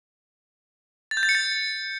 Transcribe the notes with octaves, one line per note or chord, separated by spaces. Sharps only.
A6
G6
A6
C#7
A6